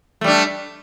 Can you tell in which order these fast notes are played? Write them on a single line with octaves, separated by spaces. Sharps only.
A3 G3 D4